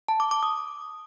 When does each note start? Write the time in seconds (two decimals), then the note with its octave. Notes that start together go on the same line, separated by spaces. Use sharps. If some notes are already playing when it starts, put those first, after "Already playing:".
0.08 A5
0.20 D6
0.31 D6
0.43 D#6